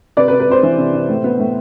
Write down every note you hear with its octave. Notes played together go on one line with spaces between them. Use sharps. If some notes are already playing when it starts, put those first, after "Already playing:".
C3 B4 D5
B4
C3
B4
C3 C5
E3
C3
C3
A2
B3
A2